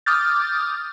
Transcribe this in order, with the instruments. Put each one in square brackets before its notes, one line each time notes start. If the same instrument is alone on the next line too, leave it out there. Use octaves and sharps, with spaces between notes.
[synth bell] D6 D#6 F6 G6 A6